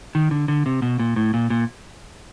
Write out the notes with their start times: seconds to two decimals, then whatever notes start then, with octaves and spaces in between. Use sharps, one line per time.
0.15 D#3
0.31 D3
0.48 D3
0.66 C3
0.82 B2
0.99 A#2
1.16 A2
1.34 A#2
1.50 A#2